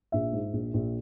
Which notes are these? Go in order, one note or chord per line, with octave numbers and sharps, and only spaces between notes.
A#1 E5
G#2
A#1
A#1